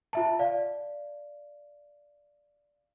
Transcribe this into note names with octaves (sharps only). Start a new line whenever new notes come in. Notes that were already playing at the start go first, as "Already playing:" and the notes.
F4 E5 A5
D5 F5